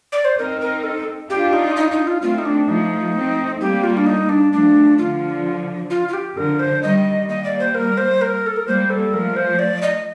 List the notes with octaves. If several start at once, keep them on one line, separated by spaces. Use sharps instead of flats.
D5
C5
C4 D#4 A#4
A#4
A4
D4 F4 G4
D#4
D#4
D#4
F4
A3 C4 F4
D#4
D4
F3 A3 D#4
A3 C4
G3 A#3 G4
F4
D4
D#4
D4
F3 A3 D4
D3 F3 F4
F4
F4
G4
D3 F3 A#4
C5
D#3 G3 D#5
G3 A#3 D#5
D5
C5
A#4
C5
A#4
A4
A#4
G3 A#3 C5
A4
F3 A3 A#4
C5
D5
D#5